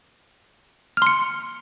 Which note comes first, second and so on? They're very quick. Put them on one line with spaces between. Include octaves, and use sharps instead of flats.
F6 C6 C#7